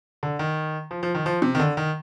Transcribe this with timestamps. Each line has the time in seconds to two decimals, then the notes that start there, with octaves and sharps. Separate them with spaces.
0.23 D3
0.39 D#3
0.91 F3
1.03 F3
1.14 D#3
1.26 F3
1.42 C3
1.55 D#3
1.60 D3
1.77 D#3